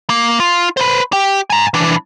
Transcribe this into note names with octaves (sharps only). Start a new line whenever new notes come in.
A#3
F4
B4 C5
G4
G#5 A#5
E3 D4